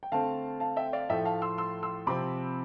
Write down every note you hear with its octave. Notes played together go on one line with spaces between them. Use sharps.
G5
D3 A3 C4 F5 A5
F5 A5
E5 G5
D5 F5
A2 F3 A3 E5 G5
F5 A5
C6 E6
C6 E6
C6 E6
C3 F3 C4 B5 D6